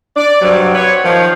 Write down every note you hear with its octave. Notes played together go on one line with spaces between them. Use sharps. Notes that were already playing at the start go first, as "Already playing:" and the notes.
D5
G2 C3 F#3
C4 B4 C#5
D#3 F3